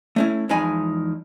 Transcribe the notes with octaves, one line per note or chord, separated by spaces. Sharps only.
A3 C#4 E4
E2 F3 G#3 D#4 G#5 B5